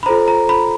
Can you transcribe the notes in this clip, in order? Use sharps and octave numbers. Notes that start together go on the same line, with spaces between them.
B5
F4 A4 C5 A#5
A#5
B5